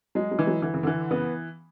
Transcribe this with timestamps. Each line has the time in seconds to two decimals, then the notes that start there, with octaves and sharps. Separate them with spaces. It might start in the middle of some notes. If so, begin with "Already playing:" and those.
0.15 F#3 G#3
0.31 F#3
0.39 E3
0.47 F#3
0.62 D3 E3
0.74 C#3
0.83 D3 E3
1.11 C#3 B3